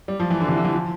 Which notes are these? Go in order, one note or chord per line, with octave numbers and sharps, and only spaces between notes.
G3
F3
E3
D3
C3
D3
E3
F3